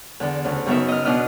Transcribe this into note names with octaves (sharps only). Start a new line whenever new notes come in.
E2 D3
D2 C#3
F#2 C#3 B3 D#4 E5
D#5 F6
B2 D4 E4 D#5 F6